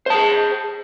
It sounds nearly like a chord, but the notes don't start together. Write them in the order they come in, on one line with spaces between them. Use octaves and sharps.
C5 A5 G#4